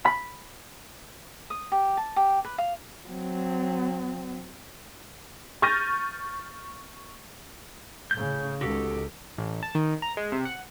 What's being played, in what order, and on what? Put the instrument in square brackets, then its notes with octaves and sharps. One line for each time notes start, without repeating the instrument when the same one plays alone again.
[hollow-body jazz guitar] B5
[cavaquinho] D#6
G4
A5
G4
B4
F5
[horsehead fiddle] F#3 C4
[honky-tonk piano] C#6 F6 G6 A6 A#6 D#7
[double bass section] A2 C#3 [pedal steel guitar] G6
[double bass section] C#2 D#3 [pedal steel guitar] F#4 G4 A4
[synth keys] A1
A5
D#3
A#5
G#3
C3
F#5